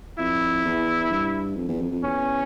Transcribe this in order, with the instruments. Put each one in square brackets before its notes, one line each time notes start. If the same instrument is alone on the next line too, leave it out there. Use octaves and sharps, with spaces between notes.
[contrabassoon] F2 [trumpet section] E4
[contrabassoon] E2
G2
F2
E2
F2
F2
[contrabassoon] E2 [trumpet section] C#4